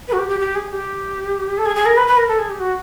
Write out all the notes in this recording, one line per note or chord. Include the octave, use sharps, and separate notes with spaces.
B4
F#4
G4
G4
G4
G#4
G4
A4
G#4
G#4
A#4
B4
B4
A#4
A4
G#4
G4
F#4